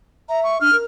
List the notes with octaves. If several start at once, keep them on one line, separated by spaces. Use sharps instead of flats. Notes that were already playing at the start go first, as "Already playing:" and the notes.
E5 A#5
C#6
D4 F6
A#4